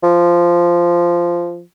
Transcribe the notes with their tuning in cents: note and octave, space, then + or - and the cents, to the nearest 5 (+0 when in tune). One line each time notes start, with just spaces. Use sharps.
F3 -10